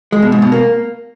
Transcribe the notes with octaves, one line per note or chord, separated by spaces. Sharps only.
G#3
B2
G#2
B2
A#3